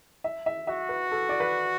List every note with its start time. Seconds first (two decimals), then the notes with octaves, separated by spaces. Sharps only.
0.24 E5
0.46 E5
0.67 F#4 E5
0.89 B4
1.12 A4
1.29 D5
1.40 B4